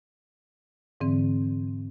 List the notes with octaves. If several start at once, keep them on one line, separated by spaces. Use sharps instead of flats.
G#2 D3 E3 C4